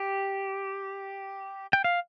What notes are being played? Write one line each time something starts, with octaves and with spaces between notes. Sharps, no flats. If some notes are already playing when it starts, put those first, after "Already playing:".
Already playing: G4
G5
F5